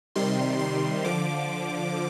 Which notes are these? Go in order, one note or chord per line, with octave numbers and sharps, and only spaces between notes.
C3 D#3 G3 C6
C6
D3 F3 D6